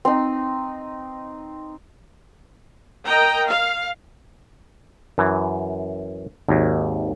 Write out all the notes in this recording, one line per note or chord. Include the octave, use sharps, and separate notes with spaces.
C4 D#4
A#4 D#5 G5 A#5
F5
F#2 E3
G#1 D#2